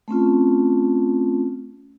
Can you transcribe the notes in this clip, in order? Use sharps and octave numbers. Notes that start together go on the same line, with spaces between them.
A3 C4 C#4 F4